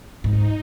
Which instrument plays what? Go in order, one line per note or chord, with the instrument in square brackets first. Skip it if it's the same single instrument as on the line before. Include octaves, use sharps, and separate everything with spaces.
[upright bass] G#2 [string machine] D#4